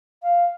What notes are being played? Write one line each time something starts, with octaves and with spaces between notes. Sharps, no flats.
F5